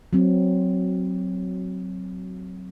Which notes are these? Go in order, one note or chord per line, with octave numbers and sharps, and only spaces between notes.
F#3 C4